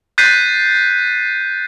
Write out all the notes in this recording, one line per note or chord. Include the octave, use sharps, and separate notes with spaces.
F#6 G6 A6 B6 C7 D#7